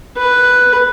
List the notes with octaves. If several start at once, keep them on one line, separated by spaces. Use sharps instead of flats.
B4